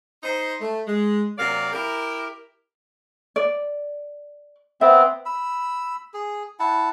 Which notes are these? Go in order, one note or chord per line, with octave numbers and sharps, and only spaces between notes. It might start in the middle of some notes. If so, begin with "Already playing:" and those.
D#4 C5
A3
G#3
C3 F#3 A#3 D5 F5
E4 G4 A#4
D5
B3 C4 E5
B5 E6
G#4
E4 F#5 A5